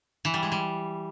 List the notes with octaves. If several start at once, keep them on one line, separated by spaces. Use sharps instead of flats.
E3
G3
G#3
G3